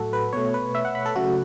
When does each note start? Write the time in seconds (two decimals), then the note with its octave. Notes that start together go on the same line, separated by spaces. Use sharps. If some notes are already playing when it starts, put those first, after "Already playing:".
Already playing: A2 F#3 A3 F#4 A4
0.13 B4
0.33 B2 A3 C#5
0.54 B4
0.75 E5
0.85 F#5
0.95 B5
1.06 A4
1.15 C#3 F#3 A3 F#4